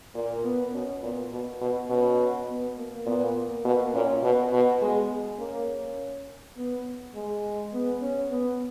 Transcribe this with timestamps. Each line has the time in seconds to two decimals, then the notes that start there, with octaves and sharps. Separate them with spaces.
0.15 A#2 A#3
0.44 B3
0.73 B2 C#4
1.03 A#2 B3
1.31 B2 B3
1.61 B2
1.90 B2 C#4
2.49 B3
2.77 A#3
3.06 A#2 B3
3.36 A#3
3.64 B2 A#3
3.94 A#2 C#4
4.23 B2 B3
4.53 B2
4.82 G#3
5.39 A#3 C#4
6.57 B3
7.15 G#3
7.73 B3
8.02 C#4
8.31 B3